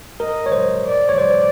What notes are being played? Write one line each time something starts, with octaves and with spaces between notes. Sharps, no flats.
A#4 D#5
C#5
C5
D5
C#5
C5 D5